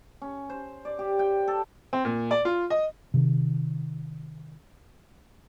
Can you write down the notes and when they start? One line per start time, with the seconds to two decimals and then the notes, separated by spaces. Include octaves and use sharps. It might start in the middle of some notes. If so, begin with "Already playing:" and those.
0.22 C#4
0.50 C5
0.85 D5
0.99 G4
1.19 G5
1.48 A4
1.93 C4
2.05 A#2
2.31 D5
2.45 F4
2.70 D#5
3.14 C3 D#3